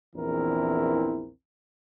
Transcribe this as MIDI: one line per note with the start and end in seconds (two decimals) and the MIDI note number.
0.16 1.29 34
0.16 1.29 40
0.16 1.29 52
0.16 1.29 60
0.16 1.29 64
0.16 1.29 70